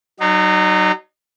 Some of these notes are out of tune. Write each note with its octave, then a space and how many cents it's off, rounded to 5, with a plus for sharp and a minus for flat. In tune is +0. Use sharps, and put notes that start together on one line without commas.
F#3 +30 D#4 -25